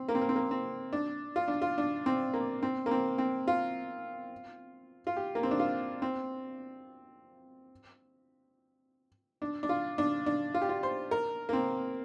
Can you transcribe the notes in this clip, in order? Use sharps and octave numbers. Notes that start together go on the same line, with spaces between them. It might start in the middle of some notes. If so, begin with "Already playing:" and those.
Already playing: C4
A#3
C4
A#3
C4
A#3
C4
D4
F4
D4
F4
D4
C4
A#3
C4
A#3
C4
C4
F4
F4
G4
A#3
C4
D4
F4
C4
D4
D4
F4
D4
D4
F4
G4
F4
C5
A#4
A#3
C4